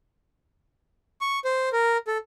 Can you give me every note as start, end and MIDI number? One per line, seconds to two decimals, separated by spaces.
1.21 1.39 85
1.45 1.69 72
1.72 1.97 70
2.07 2.18 69